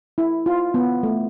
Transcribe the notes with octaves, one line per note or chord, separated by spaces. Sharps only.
E4
F4
B3
A3